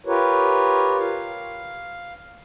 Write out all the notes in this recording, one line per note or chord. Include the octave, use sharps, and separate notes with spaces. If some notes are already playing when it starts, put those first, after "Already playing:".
F4 G4 A#4 B4 C#5
F5